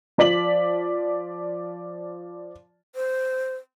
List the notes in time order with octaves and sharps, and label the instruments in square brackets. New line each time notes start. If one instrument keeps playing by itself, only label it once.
[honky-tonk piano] F3 D5 B6 F#7
[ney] C5